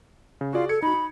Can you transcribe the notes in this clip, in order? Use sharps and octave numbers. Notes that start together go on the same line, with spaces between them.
C#3
F4 F#4 G#4 D5
A4 G#6 C#7
D#4 F#4 B5
D#4